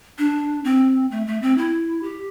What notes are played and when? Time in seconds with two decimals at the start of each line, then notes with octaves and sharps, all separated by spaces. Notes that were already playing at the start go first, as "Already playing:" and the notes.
0.19 D4
0.65 C4
1.11 A3
1.27 A3
1.42 C4
1.58 E4
2.03 G4